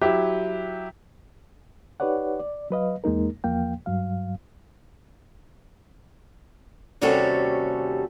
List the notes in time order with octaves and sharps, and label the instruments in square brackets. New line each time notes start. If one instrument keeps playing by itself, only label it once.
[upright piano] F#3 E4 G4
[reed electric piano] D#4 G4 B4 C#5 D5 F#5
D5
F#3 B4 D#5 F5
E2 G#3 A#3 D#4 A#4
E2 F3 A#3 F5 G5
G2 F#3 F5
[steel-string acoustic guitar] D#2 C3 G3 C#4 F#4 A4